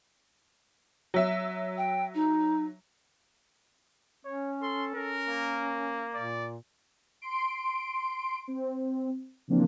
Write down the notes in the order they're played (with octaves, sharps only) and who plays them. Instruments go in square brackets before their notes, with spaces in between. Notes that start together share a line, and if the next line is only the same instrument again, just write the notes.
[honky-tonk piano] F#3 E5
[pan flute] G5
D#4
[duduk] C#4 [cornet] C#5
[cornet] A4 [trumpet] C6
[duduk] C#4 [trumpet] A#4
[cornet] A#3
[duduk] A#2 [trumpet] D5
[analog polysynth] C6 D7
C4
C#3 E3 F3 A#3 C4 D4